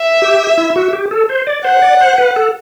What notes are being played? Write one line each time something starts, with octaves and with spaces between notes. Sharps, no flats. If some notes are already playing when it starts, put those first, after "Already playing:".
Already playing: E5
G4
E4
F#4
G4
A4
C5
D5
C5 F#5
D5
C5
B4
A4